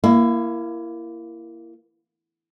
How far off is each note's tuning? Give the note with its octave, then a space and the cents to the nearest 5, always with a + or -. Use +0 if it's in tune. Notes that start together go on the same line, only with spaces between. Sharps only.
A#3 +0 E4 +25